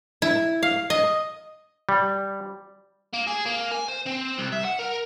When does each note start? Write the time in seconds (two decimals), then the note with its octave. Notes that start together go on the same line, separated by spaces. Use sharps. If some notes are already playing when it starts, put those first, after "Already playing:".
0.22 E4
0.63 F5
0.90 D#5
1.89 G3
3.14 A#3
3.27 G#4
3.46 A#3
3.71 G#5
3.88 C5
4.06 C4
4.38 C2
4.52 E5
4.64 F#5
4.79 A#4